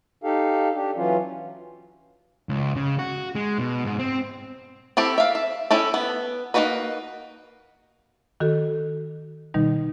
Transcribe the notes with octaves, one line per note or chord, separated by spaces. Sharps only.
D#4 G4 A4 F5
D4 G4
E3 F#3 C#4 F4
C#2
C#3
F#4
G#3
B2
G#2
C4
C4 E4 G4 A4
E5 F5
E5
C#4 E4 G4 A4
B3
A#3 C4 D#4 F#4 B4
D#3 F#4 A4
B2 D#3 G3 D#4